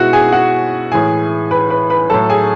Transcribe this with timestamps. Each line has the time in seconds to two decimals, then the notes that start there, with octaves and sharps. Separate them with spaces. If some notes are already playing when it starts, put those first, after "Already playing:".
Already playing: B2 G#3 E4 F#4 F#5
0.13 G#4 G#5
0.33 F#4 F#5
0.92 A2 E3 G#3 G#4 G#5
1.51 B4 B5
1.70 B4 B5
1.90 B4 B5
2.10 A2 F#3 A4 A5
2.30 G#4 G#5